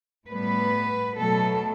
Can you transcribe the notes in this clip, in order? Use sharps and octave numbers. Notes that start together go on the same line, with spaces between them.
A2 G3 B3 B4
B2 F#3 A3 A4